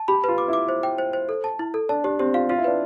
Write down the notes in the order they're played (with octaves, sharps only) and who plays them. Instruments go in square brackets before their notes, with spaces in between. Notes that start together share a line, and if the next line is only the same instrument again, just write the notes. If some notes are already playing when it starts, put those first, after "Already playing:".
Already playing: [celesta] A5
[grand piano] G4 [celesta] B5
[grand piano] F4 [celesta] B4
[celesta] D6
[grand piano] E4 [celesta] D6
[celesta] C5
G5
C5
C5
A4
A5
E4
A4
[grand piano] D4 [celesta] A5
[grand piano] D4 [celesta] G4
[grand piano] C4 [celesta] G4
[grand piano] F4 [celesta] F5
[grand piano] F4 [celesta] F5
[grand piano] E4
[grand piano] D4 [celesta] B4